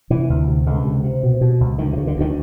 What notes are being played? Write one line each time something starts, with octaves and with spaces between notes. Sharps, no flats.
C3 E3
D2
C3
C#2 D3
C3
C3
B2
B2
C#2
D2 D#3
E3
C#3
D3
D2 D#3